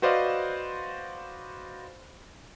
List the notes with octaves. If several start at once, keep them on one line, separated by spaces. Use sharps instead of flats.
F#4 B4 C5 D5 D#5 F5